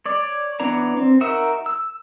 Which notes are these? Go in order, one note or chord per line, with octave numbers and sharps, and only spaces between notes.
C#5 D5
E3 B3 D4 C#5 A#5
C4
D#4 F#4 A#4 E5
E6